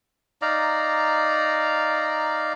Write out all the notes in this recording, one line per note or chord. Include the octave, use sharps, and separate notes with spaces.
D#4 D5 F5 A#5